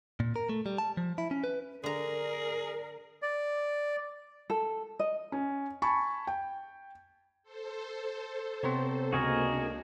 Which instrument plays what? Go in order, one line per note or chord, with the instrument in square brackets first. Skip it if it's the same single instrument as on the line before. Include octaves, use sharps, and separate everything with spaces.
[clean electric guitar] A#2
A#4
A3
G3
A5
F3
E4
C#4
B4
[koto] D3 A#5 [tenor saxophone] G#4 [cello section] A#4 [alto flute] D5
[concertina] D5
[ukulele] A4
D#5
[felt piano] C#4
G#5 A5 B5 C#6
G5
[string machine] A4 C5
[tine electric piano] C3 B3 C4 [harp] C#5 A#5 C6
[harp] C#2 [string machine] A#3 D4 [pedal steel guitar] F#4 G#4 A#4